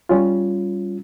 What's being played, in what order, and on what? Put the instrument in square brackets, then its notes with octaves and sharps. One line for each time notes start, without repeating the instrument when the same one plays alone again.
[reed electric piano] G3 C#4 F4